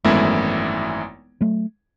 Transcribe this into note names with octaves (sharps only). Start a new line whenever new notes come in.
G#1 F#2 E3 G#3 A3 B3 E4
F#3 A3